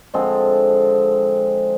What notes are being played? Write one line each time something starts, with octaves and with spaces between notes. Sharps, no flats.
D3 F3 G#3 C4